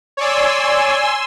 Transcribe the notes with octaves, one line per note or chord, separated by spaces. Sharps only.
C#5 D5 G#5 C6 E6